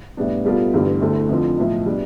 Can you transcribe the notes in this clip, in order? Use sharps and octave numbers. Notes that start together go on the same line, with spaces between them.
A2 G3 B3 D4
B2 G3 B3 F4 A4
A1 G2 D3 G3 B3
D2 D3 A3 E4
F2 D3 F3
B1 A2 F3
B2 G3 D4